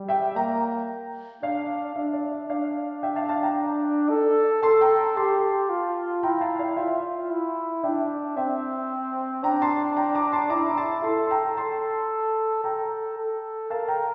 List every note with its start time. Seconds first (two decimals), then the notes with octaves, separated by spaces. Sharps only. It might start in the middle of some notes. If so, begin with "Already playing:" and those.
Already playing: G3
0.09 E5 G5
0.35 A#3 G5 A#5
1.42 D4 D5 F5
1.95 D4 E5
2.13 D5
2.32 E5
2.49 D4 D5 F5
3.03 E5 G5
3.16 F5 A5
3.29 F5 A5
3.43 G5 A#5
4.10 A4
4.62 A4 A5 C6
4.81 G5 A#5
5.17 G4 A5 C6
5.69 F4
6.23 E4 G5 A#5
6.41 F5 A5
6.59 D5 F5
6.76 F4 E5 G5
7.31 E4
7.83 D4 E5 G5
8.36 C4 E5 G5
9.43 D4 G5 A#5
9.62 A5 C6
9.97 G5 A#5
10.15 A#5 D6
10.32 A5 C6
10.50 E4 A#5 D6
10.77 A5 C6
11.03 A4 A5 C6
11.27 C6
11.31 G5 A#5
11.57 A4 A5 C6
12.64 A4 G5 A#5
13.18 A4
13.70 A#4 F5 A5
13.88 G5 A#5